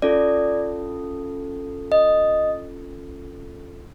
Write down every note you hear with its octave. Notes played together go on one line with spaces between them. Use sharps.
C#4 F4 A4 D5
D#5